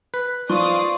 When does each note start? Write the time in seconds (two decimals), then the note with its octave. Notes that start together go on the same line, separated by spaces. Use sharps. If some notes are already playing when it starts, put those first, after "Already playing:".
0.14 B4
0.50 F3 D5 F5 C6 C#6 D#6